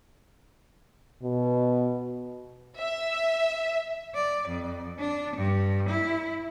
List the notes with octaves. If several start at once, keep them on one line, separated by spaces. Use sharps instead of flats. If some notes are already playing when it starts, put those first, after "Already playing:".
B2
E5
D5
F2
D4
G2
E4